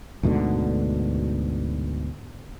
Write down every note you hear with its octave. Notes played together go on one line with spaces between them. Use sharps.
D2 G#2 B2 D3